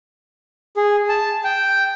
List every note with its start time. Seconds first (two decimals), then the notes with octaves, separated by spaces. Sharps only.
0.77 G#4
1.09 A5
1.44 G5